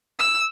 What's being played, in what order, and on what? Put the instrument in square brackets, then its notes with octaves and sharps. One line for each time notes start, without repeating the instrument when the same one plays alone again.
[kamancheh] E6